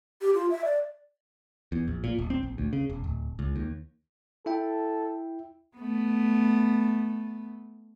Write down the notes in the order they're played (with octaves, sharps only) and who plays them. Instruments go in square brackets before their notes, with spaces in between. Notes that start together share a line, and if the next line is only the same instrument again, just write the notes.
[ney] G4
F4
E5
D5
[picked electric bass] E2
A#1
A#2
D#1
C4
A#1
D2
C#3
E1
D1
C#2
D#2
[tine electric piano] E4 E5 G5 [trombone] A4
[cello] A3 B3